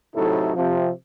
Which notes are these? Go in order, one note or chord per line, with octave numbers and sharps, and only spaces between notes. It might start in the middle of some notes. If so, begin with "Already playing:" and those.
A2 C3 F#3 D#4 E4 A4
C3 F3